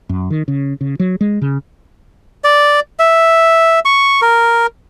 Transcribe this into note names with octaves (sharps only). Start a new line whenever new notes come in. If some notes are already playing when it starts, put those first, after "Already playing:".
F#2
D#3
C#3
C#3
F#3
G#3
C#3
D5
E5
C#6
A#4